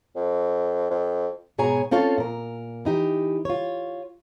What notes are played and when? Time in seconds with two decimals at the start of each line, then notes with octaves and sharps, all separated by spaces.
0.16 F2
0.90 F2
1.58 G#2 B2 G#4 C#5 G#5 A#5
1.91 C4 C#4 F4 A4 C#5 F5
2.18 A#2 A#4
2.85 E3 D#4 G4
3.45 F4 C#5